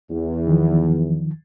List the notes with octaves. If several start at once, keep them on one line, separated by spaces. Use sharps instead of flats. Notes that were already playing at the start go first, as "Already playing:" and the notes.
E2
D#3 F3